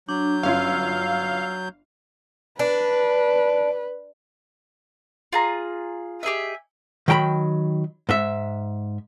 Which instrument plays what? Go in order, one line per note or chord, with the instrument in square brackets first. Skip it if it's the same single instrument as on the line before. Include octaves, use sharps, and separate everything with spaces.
[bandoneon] F#3 G6 [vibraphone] D4
[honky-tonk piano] G1 C#4 F4 [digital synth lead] F5 [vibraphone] E6
[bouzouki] D4 [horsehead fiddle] B4
[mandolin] F4 G#4 A#5
G4 G#4 D#5 E5
[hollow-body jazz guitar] D#3 F#3 G5 A#5 B5
G#2 E5